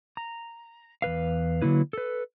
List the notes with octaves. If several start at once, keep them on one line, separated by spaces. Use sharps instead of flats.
A#5
E2 G2 B4 F5
D3 F#3 A#3 E4 B4
A4 B4